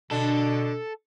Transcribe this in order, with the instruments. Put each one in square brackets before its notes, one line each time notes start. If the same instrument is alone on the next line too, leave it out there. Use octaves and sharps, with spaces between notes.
[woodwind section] B2 [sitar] D3 D4 [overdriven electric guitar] A4